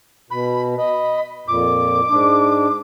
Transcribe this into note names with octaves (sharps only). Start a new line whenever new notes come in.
B2 B5
D#5 B5
F2 A#2 D6
G#2 D4